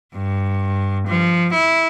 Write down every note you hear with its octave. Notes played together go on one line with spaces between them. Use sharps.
G2
F3
E4